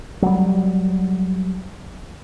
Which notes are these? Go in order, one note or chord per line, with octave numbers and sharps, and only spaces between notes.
F#3 G3